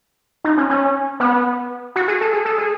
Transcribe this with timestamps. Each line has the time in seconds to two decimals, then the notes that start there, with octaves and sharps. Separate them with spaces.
0.44 D#4
0.58 C#4
0.70 C#4
1.20 B3
1.96 F#4
2.08 G#4
2.21 A4
2.33 G#4
2.45 A4
2.58 G#4